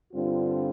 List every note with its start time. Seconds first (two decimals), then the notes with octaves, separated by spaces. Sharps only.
0.12 G2 D3 G3 C4 F4